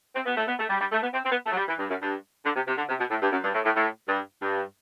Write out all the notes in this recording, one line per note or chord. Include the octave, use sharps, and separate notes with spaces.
C4
B3
A3
B3
A3
G3
G3
A3
B3
C4
C4
B3
A3
F#3
G3
E3
G2
F#2
G2
D3
C3
C3
D3
C3
B2
A2
G2
F#2
G2
A2
A2
A2
G2
G2